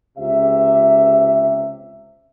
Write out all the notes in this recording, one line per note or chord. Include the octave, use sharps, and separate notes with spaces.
C#2 C3 E5